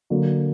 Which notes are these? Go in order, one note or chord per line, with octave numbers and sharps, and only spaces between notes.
D3 F#3 A#3